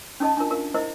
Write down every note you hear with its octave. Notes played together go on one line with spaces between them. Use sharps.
C#4 D#4 A4 D#5 A5
D4 E4 F4 A#4
F4 A#4 F5
E4 A#4 C5 D#5 E5